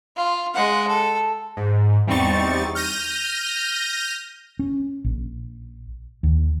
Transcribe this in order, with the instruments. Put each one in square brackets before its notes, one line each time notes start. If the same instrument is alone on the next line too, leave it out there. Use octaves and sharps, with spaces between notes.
[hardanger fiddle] F4
G#3 F#5
A4
[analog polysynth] G#2
E2 G3 C4 D#4 C#6 A6
F6 G6 A#6 D#7
[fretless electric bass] C#4
A#1
D#2